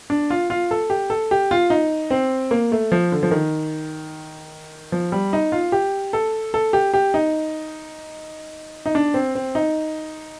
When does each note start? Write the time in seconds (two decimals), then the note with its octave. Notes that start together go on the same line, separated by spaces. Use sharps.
0.10 D4
0.30 F4
0.50 F4
0.71 A4
0.90 G4
1.10 A4
1.31 G4
1.51 F4
1.70 D#4
2.11 C4
2.51 A#3
2.72 A3
2.92 F3
3.12 D3
3.23 F3
3.31 D#3
4.92 F3
5.12 G3
5.33 D#4
5.52 F4
5.72 G4
6.13 A4
6.54 A4
6.73 G4
6.94 G4
7.14 D#4
8.86 D#4
8.95 D4
9.14 C4
9.35 C4
9.55 D#4